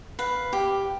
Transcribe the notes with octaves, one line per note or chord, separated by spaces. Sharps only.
B4 F5
G4